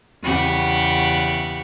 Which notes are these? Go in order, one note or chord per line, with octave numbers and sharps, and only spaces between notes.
E2 C#3 G4 F#5 B5 C#6